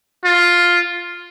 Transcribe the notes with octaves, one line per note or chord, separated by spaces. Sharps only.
F4